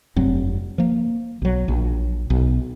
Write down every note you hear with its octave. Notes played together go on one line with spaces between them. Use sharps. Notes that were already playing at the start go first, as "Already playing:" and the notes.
F1 G2 F#3 C4
F3 A#3
B1 F#3
A#1
B1